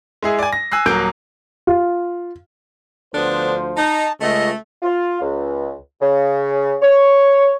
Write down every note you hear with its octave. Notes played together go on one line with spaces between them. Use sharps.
G#3 E4 G#4
D5 G#5
A#6
G#5 E6 F#6 C7
D#1 F#3 A#3 G6 D7
F4
D2 D3 F3 B3 D4 C5
D#4 A5
C#2 A3 D#5
F4
C#2
C#3
C#5